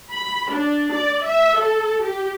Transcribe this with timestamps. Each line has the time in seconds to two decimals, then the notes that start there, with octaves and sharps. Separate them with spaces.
0.12 B5
0.51 D4
0.93 D5
1.25 E5
1.60 A4
2.04 G4